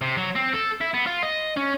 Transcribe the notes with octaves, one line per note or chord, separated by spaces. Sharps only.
C3
F#3
C4
A4
E4
B3
F4
D#5
C#4